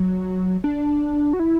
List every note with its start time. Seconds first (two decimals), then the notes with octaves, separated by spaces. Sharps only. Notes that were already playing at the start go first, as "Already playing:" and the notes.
Already playing: F#3
0.64 D4
1.33 F#4
1.39 E4